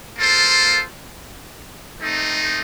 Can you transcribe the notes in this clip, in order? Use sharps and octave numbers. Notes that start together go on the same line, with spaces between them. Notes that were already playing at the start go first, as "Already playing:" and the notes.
A#3 F4 A4 C5
A3 C4 D#4